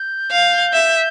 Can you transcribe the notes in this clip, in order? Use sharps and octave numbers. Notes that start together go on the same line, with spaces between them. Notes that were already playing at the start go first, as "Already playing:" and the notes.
Already playing: G6
F5
E5